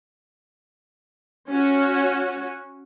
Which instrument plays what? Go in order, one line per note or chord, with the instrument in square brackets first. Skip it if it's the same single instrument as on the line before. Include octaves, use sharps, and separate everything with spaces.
[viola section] C#4 F#4